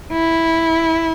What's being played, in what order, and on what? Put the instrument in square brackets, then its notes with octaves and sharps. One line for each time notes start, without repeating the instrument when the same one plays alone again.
[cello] E4